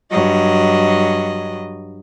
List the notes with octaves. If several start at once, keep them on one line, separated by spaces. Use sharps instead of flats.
G2 F#3 D#5